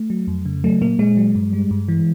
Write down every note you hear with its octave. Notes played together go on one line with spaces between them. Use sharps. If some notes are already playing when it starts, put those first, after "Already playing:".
Already playing: A3
F#3
F2
C#3
F#3 A3
A#2 A#3
A#2 G#3
F#3
G2
G3
G2
E3